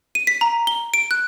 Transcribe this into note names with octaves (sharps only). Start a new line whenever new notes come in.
D#7
B6
A#5
G7
D7
F#6